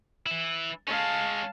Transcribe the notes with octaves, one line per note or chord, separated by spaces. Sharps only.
E3 E4
G#3 C#4 F5 A5